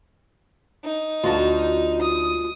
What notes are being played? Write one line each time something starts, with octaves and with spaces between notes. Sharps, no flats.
D#4
D2 F4 F#4 A5
D#6